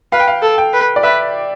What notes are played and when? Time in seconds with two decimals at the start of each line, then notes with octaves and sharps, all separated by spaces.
0.12 B4 F5
0.20 G5
0.28 F5
0.42 A4
0.58 G5
0.73 B4
0.96 D5
1.03 B4 E5